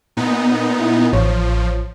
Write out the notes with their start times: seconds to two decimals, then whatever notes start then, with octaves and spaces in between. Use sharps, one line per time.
0.17 A#2 B3 D#4
0.80 E4
1.13 A1 F3 C#5